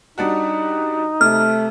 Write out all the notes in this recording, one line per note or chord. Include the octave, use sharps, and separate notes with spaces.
G3 D4 D#4 F#4
C3 A3 F6